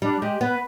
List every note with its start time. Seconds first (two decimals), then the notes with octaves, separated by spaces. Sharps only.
0.02 G3 D4
0.21 G#3 G4
0.41 B3 B4